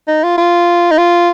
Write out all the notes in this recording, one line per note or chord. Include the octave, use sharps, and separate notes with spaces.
D#4
F4
F4
D#4
F4